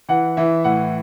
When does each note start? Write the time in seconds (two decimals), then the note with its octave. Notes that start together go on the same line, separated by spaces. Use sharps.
0.09 E3 F#5
0.37 E3 E5
0.64 A2 F#5